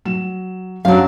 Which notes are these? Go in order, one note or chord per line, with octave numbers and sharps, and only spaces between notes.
F#3 E7
F#2 F#3 D4 F5